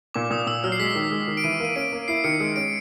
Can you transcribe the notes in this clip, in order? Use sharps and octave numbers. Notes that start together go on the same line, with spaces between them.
A#2 D6
A#2 D#6
A#2 E6
F#3 F6
C7
G#3 B6
D#3
G#3
D#3
D7
E3 D#7
A#3 D#7
C#4 D7
A#3
E4 C7
D#3 C#7
G#3 C#7
C#4 D7